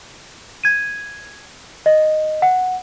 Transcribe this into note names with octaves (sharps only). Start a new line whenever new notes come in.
G#6 D#7
D#5
F#5